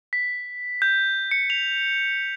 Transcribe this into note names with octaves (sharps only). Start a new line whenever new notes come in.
B6
G6
C#7
F7